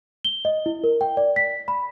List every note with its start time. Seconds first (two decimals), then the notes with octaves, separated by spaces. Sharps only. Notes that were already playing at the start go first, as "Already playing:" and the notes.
0.25 G7
0.45 D#5
0.66 E4
0.84 A#4
1.01 G5
1.17 D5
1.36 B6
1.68 B5